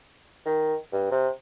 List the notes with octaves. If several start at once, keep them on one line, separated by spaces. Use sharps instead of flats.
D#3
G2
C3